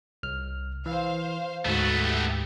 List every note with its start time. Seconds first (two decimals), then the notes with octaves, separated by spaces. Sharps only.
0.23 C2 F6
0.86 E3 C5 F5
1.66 D2 G#2 A3 B3 F#4
2.03 G4